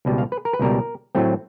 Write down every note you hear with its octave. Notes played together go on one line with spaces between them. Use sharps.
C#2 B2 G3
F5
B4
A#4
B4
C#2 B2 G3 A#4
A2 F#3 A3 C4